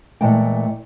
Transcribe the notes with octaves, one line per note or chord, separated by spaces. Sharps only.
A#2 E3 G#3 A3 F#5 G5